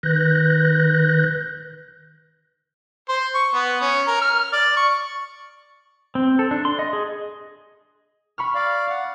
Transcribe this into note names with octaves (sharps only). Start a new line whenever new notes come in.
D#3 B4 F#6 G6 A#6
C5
C#6
B3
C#4
A#4
F6
D5
C#6
C4
A4
D4
C6
D#5
G#4
B5 C#6 F6
D5 F5
F#5